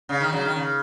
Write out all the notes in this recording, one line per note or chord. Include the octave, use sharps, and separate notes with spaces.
C#3
D#3
C#3 F#3
D#3
C#3